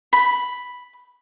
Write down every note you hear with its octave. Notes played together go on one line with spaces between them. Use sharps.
B5